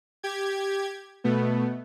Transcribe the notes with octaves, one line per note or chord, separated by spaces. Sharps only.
G4 G#6
B2 A3 B3